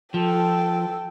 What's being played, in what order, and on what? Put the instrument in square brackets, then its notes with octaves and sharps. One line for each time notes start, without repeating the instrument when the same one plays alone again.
[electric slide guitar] F3 [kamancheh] A4 G5